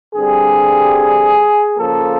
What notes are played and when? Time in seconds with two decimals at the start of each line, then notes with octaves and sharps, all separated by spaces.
0.13 G2 D3 G3 C4 G#4
1.76 C#3 F3 A#3 A4